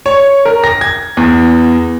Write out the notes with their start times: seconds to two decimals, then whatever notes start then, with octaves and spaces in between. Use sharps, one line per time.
0.06 C#5
0.45 A#4
0.64 A#6
0.81 G#6
1.17 E2